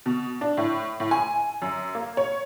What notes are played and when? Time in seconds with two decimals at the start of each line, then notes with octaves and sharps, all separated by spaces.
0.06 B2
0.41 D4
0.57 A2
1.00 A2
1.11 G#5
1.62 F#2
1.95 A#3
2.17 C#5